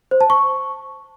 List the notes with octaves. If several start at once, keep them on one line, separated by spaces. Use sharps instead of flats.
C5
A5
C#6